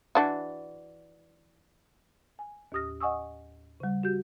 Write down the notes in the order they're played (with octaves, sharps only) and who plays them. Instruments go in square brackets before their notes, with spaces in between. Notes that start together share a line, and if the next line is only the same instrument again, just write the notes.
[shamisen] E3 D4 F#4
[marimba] G#5
D#2 A2 G4 D#6 F6 A#6
D#5 F#5 G#5 C#6 D#6 E6
C#3 G3
F#4 G4 G6